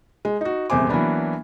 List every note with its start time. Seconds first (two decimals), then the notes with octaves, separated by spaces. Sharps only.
0.25 G#3
0.41 D#4 F#4
0.70 D#1 E2 C3 C5 G#5 D6
0.89 E3 F#3 A#3 B3 D4